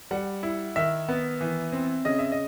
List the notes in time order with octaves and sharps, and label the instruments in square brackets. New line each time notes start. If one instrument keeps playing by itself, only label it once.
[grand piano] G3 F#5
E4
D#3 E5
B3
E3
C4
C#3 D#5
E5
D#5